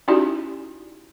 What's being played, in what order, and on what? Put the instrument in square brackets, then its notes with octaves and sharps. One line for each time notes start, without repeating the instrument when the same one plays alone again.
[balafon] C#4 D#4 E4 F#4 G4 D5